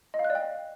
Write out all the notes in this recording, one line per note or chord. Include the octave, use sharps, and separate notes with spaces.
D#5
F5
F#6
D5
G5